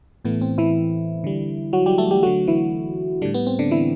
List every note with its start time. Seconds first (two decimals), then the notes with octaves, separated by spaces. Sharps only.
0.25 A2 E3 A3 B3
0.41 C4
0.58 E3 E4
1.24 D3 G3
1.73 F#3 F#4
1.86 G3 G4
1.98 A3 A4
2.11 G3 G4
2.23 D3 F#3 A3 F#4
2.47 E3 E4
3.22 A2 D3 G3 D4
3.34 B3
3.47 C4
3.59 D3 D4
3.71 E3 E4